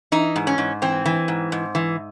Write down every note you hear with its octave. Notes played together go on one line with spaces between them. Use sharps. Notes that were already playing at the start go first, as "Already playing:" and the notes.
E3 D#4
G#2
C#4
G#2
E3 C4
E3
G#2
G#2
E3